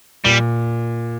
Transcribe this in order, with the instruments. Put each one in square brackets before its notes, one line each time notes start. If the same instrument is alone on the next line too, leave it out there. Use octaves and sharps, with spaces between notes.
[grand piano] A#2 [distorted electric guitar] G3